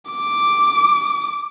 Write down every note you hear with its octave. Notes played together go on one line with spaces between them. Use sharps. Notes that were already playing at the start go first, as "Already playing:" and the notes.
D6